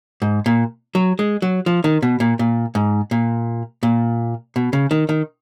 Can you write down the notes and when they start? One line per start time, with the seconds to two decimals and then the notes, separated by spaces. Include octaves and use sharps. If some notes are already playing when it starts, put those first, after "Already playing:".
0.22 G#2
0.46 A#2
0.95 F#3
1.19 G#3
1.42 F#3
1.66 F3
1.84 D#3
2.02 B2
2.20 A#2
2.39 A#2
2.75 G#2
3.11 A#2
3.83 A#2
4.56 B2
4.73 C#3
4.91 D#3
5.09 D#3